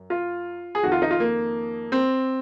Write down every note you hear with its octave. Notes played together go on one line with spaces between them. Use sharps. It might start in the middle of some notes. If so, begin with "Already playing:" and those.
Already playing: F#2
F4
G#4
F2 D#3 F#4
F4
D#4
F4
A#3
C4